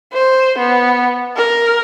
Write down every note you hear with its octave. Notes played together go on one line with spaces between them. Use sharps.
C5
B3
A#4